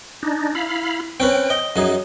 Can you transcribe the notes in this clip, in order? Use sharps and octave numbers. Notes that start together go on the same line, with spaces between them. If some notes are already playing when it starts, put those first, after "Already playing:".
D4 D#4
E4 F5 B5
C4 C#4 B4 G5
D#5
F#2 D#4 G#4